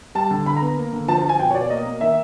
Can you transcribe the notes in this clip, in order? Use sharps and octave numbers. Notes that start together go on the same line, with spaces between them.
G3 A5
D3
D3 B5
A#5
B3
A#3
D3
F3 A5
A5
F3
G#5
B2 G5
C#5
B2 D5
A#3 D#5
A#3
D#3 E5